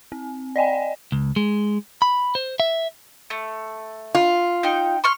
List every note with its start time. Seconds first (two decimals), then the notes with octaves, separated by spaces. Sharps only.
0.12 C4
0.56 D5 D#5 G5 G#5
1.12 C#2
1.36 G#3
2.02 B5
2.35 C5
2.60 E5
3.30 A3
4.15 F4
4.63 D#4 G5
5.04 C6 C#6 F6